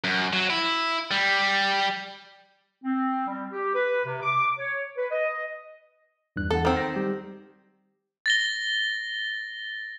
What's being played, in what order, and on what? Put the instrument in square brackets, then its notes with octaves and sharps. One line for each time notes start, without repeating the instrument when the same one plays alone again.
[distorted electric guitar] F#2
F#3
E4
G3
[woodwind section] C4
G3
G4
B4
C3
D6
C#5
B4
D#5
[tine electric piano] E2 G2 F#6
[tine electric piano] E2 F#5 [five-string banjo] A4
[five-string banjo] D#3 C4
[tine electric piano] A#6
G3 G4
[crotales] A6 A#6 G7